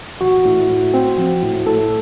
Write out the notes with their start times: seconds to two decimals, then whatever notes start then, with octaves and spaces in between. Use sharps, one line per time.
0.21 A1 F#4
0.45 A2
0.70 A2
0.94 C4
1.18 F3
1.42 A2
1.66 A2 A4